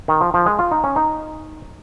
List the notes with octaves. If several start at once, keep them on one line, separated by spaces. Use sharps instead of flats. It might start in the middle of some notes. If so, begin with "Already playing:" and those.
D#3
F3
F3
G#3
F4
D#4
C#4
D#4